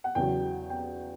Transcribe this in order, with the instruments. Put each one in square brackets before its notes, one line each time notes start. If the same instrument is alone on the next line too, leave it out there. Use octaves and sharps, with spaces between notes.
[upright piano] F#5
E2 C#3 F#3 G5
G5